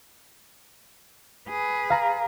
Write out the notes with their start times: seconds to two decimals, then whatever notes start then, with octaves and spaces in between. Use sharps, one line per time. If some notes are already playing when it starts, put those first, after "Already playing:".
1.49 G#4 B4
1.90 F5 A#5